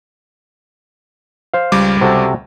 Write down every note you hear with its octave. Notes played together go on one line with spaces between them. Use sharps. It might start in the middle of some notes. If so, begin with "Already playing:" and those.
C5 F5
C#2 G3 D6
C3 F#4 A4